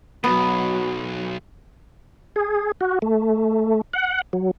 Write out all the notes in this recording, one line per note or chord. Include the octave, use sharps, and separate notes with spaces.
B1 F#3 B3
G#4
F#4
A3
F#5
F#3